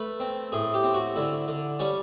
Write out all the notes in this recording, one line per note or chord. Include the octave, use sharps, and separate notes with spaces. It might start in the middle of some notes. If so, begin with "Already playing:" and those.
Already playing: A3 B4
C4
A2 G#4
G4
C4
F#4
D3 E4
D3
G3 C#4